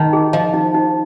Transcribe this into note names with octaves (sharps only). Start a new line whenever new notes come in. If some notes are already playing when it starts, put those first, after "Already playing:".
Already playing: D#3 D#4
G#4
F3 D#5
D#4
D#4